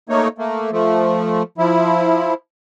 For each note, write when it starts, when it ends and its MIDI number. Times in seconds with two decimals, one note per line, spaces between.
0.09 0.28 57
0.09 0.28 58
0.09 0.28 63
0.09 0.28 73
0.38 0.71 57
0.38 0.71 58
0.72 1.43 53
0.72 1.43 57
1.58 2.34 53
1.58 2.34 64